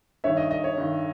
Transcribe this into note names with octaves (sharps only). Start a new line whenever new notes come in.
G2 D#3 C#5 E5
D#5
D#5
C#5
G2 D#3